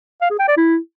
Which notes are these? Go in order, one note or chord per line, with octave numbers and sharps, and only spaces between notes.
F5
G#4
G5
D5
E4